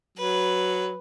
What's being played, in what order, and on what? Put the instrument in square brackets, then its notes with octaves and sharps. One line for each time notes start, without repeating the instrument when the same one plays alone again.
[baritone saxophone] F#3 [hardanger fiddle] B4